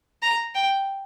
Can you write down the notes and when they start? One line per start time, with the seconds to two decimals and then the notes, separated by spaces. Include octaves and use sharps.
0.22 A#5
0.55 G5